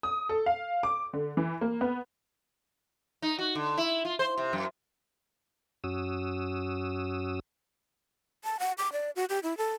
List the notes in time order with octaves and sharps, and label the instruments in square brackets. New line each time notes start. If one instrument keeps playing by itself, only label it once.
[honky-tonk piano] D#6
A4
F5
D6
D3
E3
A#3
B3
[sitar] D#4
F#4
D3
E4
F4
C5
C3
F#2
[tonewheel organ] F#2 C#4 F#4 D#6 E6
[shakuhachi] A5
F#5
D6
D5
F#4
G4
E4
A4